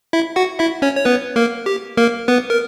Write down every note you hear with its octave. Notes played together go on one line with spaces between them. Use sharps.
E4 E5
F#4 F#5
E4 E5
C#4 C#5
C#5
B3 B4
A#3 A#4
G4
A#3 A#4
B3 B4
A#4